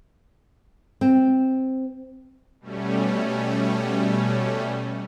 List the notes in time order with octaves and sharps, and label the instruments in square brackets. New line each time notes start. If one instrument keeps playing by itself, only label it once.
[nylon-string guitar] C4
[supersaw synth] B2 G3 A3 C#4